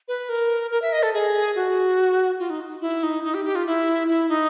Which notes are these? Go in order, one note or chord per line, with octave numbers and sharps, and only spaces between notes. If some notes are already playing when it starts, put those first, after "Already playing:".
B4
A#4
A#4
E5
D#5
A4
G#4
F#4
F4
D#4
E4
D#4
D#4
G4
G4
F4
E4
E4
D#4